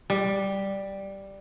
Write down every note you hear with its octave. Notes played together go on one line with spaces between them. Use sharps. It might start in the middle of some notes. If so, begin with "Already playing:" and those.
G3